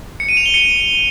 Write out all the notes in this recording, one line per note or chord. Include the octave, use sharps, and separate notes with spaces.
C#7
D#7
F7
G7
C#7